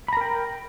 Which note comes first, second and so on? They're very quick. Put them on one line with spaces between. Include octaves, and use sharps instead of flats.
B5 A#5 A#4 G5